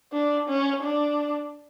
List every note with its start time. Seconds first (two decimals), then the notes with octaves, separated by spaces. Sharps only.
0.12 D4
0.49 C#4
0.83 D4